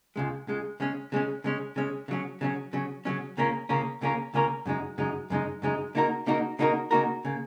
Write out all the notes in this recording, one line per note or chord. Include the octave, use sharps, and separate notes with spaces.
C#2 C#3 G#3
C#2 C#3 G#3
C#3 G#3 C#4
C#3 G#3 C#4
C#3 G#3 C#4
C#3 G#3 C#4
C#3 F#3 C#4
C#3 F#3 C#4
C#3 F#3 C#4
C#3 F#3 C#4
C#2 C#3 A#3 C#4 A#4
C#2 C#3 A#3 C#4 A#4
C#2 C#3 A#3 C#4 A#4
C#2 C#3 A#3 C#4 A#4
F#2 C#3 G#3 D#4
F#2 C#3 G#3 D#4
F#2 C#3 G#3 D#4
F#2 C#3 G#3 D#4
C#3 A#3 D#4 F#4 A#4
C#3 A#3 D#4 F#4 A#4
C#3 A#3 D#4 F#4 A#4
C#3 A#3 D#4 F#4 A#4
C#3 A#3